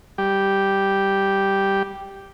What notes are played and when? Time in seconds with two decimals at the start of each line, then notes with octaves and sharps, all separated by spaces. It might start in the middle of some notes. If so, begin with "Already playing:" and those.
0.18 G3 G4